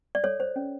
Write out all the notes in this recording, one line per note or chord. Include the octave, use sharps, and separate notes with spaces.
D5
A4 C#5
C5
C#4